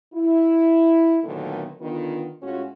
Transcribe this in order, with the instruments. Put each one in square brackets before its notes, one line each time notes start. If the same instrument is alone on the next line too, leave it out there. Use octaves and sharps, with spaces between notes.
[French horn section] E4
A#2 D3 D#3 F#3 A3 B3
D3 D#3 B3 D4 F4
A2 G#3 C#4 F4 F#4